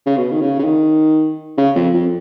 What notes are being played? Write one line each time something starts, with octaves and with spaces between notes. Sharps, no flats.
C#3
B2
D#3
C#3
C#3
D#3
C#3
F2
F2